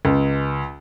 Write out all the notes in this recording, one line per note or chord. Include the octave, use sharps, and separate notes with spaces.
C#2